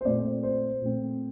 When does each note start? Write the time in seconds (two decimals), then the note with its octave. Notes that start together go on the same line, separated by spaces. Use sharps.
0.01 C5
0.05 A#2 A3 C4 D5
0.43 C5
0.82 A#2 A3 C4